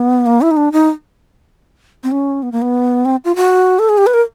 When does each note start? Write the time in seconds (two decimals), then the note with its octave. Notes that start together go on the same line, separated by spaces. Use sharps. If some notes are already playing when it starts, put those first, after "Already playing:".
Already playing: B3
0.26 A#3
0.41 E4
0.51 D#4
0.57 D4
0.72 D#4
2.04 C4
2.12 C#4
2.43 B3
2.52 A#3
2.62 B3
3.05 C4
3.25 F4
3.36 F#4
3.79 A4
3.89 G#4
3.98 G4
4.07 B4
4.14 A#4